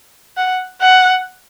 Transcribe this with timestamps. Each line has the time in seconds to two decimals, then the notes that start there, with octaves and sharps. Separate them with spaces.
0.37 F#5
0.82 F#5